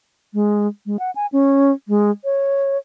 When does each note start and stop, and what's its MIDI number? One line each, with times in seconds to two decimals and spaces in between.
0.34 0.67 56
0.86 0.97 56
0.99 1.11 78
1.16 1.26 80
1.32 1.72 61
1.88 2.11 56
2.24 2.78 73